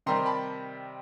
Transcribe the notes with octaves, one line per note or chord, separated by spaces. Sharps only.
C3 D#3 G3 C4 A#5 C6
A5 B5